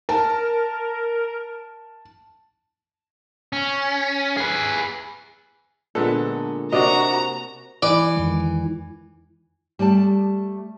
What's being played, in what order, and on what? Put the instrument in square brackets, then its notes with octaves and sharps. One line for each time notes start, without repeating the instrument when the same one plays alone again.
[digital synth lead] A#4 [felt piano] A5
[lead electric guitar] C#4
G#4 B4
[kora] A#2 D3 G#3 [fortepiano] B3 A4
[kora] C3 A#3 [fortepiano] D4 D5 D#5 [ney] F#4 [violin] A#5
[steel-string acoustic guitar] E3 [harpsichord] D5
[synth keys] F2 D#3 G#3
[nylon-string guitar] G3 A3 D5 A5